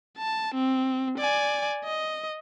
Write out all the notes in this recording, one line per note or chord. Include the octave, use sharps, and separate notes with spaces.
A5
C4
D5 G#5
D#5